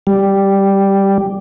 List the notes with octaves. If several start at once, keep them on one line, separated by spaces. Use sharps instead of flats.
G3